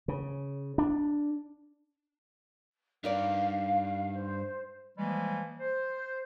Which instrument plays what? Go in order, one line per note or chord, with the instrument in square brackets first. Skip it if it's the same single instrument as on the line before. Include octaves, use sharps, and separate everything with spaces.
[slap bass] C#3
D4
[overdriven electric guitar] G2 [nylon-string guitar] D#4 A#4 D5 [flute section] F5
[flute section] C5
[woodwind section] E3 F3 G3 G#3 A#3
C5